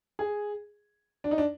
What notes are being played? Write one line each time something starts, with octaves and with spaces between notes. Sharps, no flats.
G#4
D4
D#4
D4